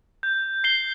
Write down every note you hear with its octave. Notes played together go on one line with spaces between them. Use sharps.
G6
C7 G7